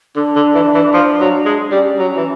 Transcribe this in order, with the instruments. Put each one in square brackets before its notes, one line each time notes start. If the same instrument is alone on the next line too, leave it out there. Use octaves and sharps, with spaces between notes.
[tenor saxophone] D3 [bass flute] D4
[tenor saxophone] D3
E3
E3
F3
F#3
G#3
[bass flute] D4
[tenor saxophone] G3 [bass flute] C#4
[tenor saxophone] F#3
E3